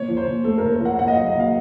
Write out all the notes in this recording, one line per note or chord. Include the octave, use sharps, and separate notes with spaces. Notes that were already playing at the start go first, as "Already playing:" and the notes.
Already playing: A#2 C#5
F3
C5
A#2
A3 A4
A#4
A#2
A#4
F3
F#5
A#2 F#5
D#5
F#3 F5
D#5
A#2 F5